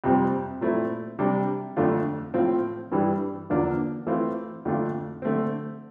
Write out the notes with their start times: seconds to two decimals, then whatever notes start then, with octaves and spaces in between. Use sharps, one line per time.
0.04 F2 C3 G3 C4
0.61 A#2 A3 C4 E4
1.19 C3 G3 D4
1.76 F2 D3 A3 D4 F4
2.34 A2 F3 C4 F4
2.92 G2 E3 G3 D4
3.50 E2 D3 F3 A#3 D4
4.07 E3 A3 C4 F4
4.65 F2 D3 A3 D4 F4
5.22 D3 A3 C4